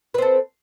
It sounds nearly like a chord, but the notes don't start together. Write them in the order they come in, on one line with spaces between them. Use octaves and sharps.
B4 C4 A4